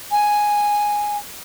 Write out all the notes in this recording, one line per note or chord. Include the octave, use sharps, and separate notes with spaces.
G#5